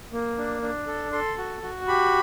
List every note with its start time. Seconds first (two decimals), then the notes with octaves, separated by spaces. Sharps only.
0.12 A#3
0.38 D4
0.62 D4
0.87 A4
1.12 A4 C6
1.38 F#4
1.62 F#4
1.88 G4 B5